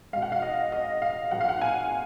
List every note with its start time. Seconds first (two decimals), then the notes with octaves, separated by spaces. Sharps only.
0.13 B2 G#3 F5
0.22 F#5
0.32 F5
0.42 D#5
0.72 D#5
1.02 F5
1.31 A#2 F#3 F#5
1.41 F5
1.49 F#5
1.61 G#5